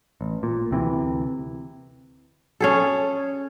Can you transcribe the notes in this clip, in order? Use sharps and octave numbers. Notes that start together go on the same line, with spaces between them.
A1
A#2
D2 C3 E3
C#4 G#4 A4